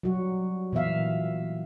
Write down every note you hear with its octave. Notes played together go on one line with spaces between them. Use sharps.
F#3 G3 F#4
A#2 E3 B3 E5 F5